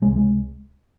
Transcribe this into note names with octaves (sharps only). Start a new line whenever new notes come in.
C#2 C3 G#3
G#3